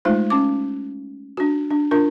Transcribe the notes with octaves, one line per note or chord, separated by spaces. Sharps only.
G#3 A3 D#4 F4 C5
C#4 D6
D4 F#4
D4
D4 F4 A#4